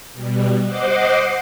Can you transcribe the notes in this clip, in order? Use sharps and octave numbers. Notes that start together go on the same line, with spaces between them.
B2 G3
C5 D#5 F#5 C6 D6